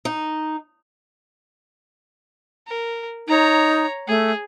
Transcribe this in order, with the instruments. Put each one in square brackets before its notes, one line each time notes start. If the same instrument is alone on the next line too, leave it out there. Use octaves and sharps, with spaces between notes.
[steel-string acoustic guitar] D#4
[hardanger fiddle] A#4
[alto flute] D#4 [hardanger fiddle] C#5 A#5
[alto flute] A3 [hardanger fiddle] G#4